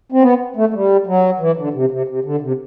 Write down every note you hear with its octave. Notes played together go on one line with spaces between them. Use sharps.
C4
B3
A3
A3
G3
F#3
E3
D3
C3
C3
C3
D3
C3